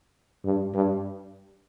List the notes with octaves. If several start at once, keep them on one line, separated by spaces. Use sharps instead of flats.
G2
G2